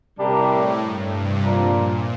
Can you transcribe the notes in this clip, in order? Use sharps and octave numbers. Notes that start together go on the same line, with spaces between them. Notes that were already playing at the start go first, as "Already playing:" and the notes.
A2 C3 G3 D4 G4 A#4
G2
C3
A#2 F3 A#3 D4
A#2